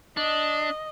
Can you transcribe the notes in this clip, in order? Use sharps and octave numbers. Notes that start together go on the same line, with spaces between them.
D4 D#5